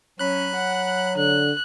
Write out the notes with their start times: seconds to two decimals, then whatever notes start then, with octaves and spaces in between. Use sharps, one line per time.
0.19 F#3 C#4 B5 F#6
0.55 F#5
1.17 D3 F#6